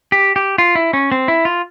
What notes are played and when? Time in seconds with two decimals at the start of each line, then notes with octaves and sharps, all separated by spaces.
0.12 G4
0.36 G4
0.58 F4
0.75 E4
0.93 C#4
1.12 C4
1.28 E4
1.45 F4